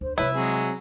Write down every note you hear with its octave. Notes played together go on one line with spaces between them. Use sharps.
D2 C5
C3 G3 E4 B4 C#5
F#3 G#3 C4 G#4